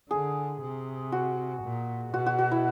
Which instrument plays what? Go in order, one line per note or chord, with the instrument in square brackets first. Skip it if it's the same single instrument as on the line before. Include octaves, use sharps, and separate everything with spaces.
[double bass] D3 [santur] G#4
[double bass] C3
[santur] F#4
[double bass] A#2
[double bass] B2 [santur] F#4
[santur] F#4
F#4
E4